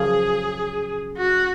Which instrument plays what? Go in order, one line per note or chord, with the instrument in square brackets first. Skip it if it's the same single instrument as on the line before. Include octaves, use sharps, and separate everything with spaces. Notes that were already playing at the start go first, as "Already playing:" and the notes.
Already playing: [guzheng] F#2 C#3 F3 [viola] G#4
[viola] F#4